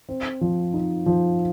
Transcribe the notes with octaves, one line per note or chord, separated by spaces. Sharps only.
C4
F3
D#4
F3